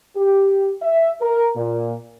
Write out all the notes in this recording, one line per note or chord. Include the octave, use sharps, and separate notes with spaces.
G4
E5
A#4
A#2